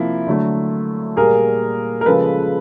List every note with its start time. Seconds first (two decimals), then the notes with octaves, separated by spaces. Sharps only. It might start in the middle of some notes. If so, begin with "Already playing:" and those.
Already playing: C3 F3 A#3 E4
0.27 D3 F#3 A3
1.17 A#2 G3 A#3 G#4 A#4
2.01 A#4
2.06 C#3 F3 G#3 A4 B4